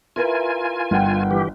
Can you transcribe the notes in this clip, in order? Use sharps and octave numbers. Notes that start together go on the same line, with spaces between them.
E4 F4 A#4 B4 G#5
G1 F#5 G5
E3 G4